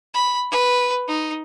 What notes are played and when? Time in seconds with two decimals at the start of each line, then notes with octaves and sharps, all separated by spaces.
0.14 B5
0.51 B4
1.08 D#4